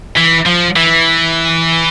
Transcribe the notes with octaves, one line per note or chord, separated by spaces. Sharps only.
E3
F3
E3